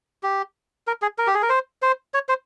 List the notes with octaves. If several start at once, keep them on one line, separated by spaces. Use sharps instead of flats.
G4
A#4
G#4
A#4
G4
G#4
A#4
C5
C5
C#5
C5